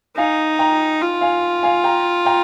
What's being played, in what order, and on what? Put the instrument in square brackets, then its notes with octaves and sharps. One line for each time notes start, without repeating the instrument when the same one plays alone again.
[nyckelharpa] D#4 [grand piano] F5 G#5
[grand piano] G5 A#5
[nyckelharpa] F4
[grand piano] F5 G#5
F5 G#5
G5 A#5
G5 A#5